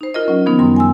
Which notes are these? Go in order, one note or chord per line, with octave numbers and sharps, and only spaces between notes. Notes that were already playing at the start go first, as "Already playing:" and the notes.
D#4 C5
F4 A#4 D#5
F#3 C#4
D#3 F3 B3 D#4
F#2 G3 C6
G#5 C6 E6